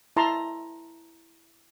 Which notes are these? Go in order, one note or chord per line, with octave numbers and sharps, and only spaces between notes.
E4 A5 A#5 C6